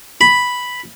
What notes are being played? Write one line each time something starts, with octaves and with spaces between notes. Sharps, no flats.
B5